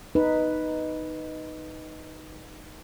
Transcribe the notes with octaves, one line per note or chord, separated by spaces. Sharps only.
D#4 B4